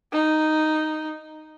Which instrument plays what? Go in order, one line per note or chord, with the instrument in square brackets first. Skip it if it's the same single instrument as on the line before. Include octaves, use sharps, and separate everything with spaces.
[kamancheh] D#4